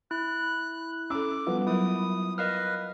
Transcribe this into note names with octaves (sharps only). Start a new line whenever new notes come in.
E4 F#6
C#4 A4 D6 E6
F3 G3 B3
F#3 E4 A#4 D#6
A#4 B4 D#5 F5 F6